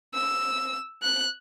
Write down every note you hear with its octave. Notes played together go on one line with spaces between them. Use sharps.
E6
F#6